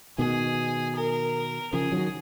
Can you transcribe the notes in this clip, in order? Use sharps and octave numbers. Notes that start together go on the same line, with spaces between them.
B2 D#3 G#4
A#4
C#3 F3 G#4
D#3 F#3